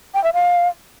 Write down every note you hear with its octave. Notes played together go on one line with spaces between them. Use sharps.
G5
E5
F5